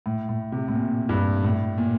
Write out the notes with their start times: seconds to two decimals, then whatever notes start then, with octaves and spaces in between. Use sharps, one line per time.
0.06 A2
0.29 A2
0.52 C3
0.68 A2
0.75 A#2
1.09 G2
1.44 A2
1.78 A#2